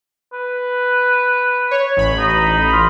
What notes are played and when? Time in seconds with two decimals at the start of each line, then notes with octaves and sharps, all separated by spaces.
0.33 B4
1.71 C#5
1.97 A1 B5
2.18 D#4
2.73 F4